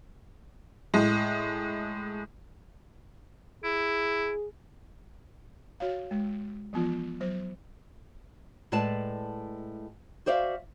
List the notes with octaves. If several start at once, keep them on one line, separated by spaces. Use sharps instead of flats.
A2 G#3
E4 G#4
F#4 C#5 F5
G#3
E3 F3 B3 F4
F#3 C5
A2 G#3 B4 D5 A5
F#4 C5 D5 E5 F5